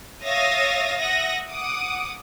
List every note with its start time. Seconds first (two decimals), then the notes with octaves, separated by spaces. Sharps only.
0.23 C#5 E5 F5 D#6 A6 A#6
0.99 E5 F#5 D#6 A#6
1.49 F#5 D6 D#6